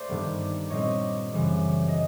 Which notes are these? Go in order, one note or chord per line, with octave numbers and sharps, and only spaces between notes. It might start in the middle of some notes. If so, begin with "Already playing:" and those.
Already playing: A3 C5 D5
G2 D#3 G3 B3
A#2 G3 C4 C#5 D#5
F#2 C#3 E3 G3 C4
D#5